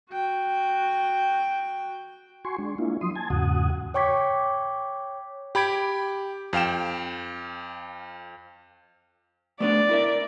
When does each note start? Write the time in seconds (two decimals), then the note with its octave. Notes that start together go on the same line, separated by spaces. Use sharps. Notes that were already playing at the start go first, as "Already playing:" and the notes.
0.11 F#4 G5
2.45 F#4 G#5 C6 C#6
2.58 G#3 D4
2.78 A#3 D4 E4 F4
3.01 F3 F#3 C6 D#6
3.16 G#5 A5 G#6
3.30 E2 G#2 C#3 F#4 F#5 D#6
3.94 C#5 G5 C#6 D6 G#6 B6
5.55 G4 B5 G#6 D7
6.53 F2 F5 G5 E7
9.60 A3 B3 D4 D5
9.89 E4 A#4 E5